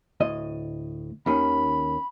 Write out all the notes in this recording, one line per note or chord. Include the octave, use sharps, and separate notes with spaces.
D2 A2 D#5
D#2 D#3 C#4 B5